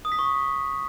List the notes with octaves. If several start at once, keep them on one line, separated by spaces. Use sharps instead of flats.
D#6
B6
C#6